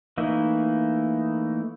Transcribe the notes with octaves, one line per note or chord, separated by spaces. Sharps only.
E3 A3 A#3 D#4 E4